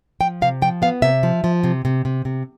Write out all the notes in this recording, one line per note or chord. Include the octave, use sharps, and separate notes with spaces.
F3 G5
C3 F5
F3 G5
B3 F5
C3 E5
F3
F3
C3
C3
C3
C3